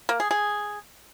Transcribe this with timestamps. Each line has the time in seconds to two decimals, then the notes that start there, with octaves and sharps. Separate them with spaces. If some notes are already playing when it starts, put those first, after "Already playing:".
0.09 A#3
0.20 G#4
0.31 G#4